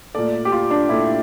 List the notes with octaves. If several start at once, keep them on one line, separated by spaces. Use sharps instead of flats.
A#2 A3 D5
G4
F4
D4
A#2 A3 E4